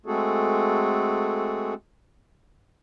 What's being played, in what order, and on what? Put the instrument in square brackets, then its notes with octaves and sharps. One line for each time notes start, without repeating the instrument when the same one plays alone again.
[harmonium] G#3 A3 C4 F#4 G#4 A4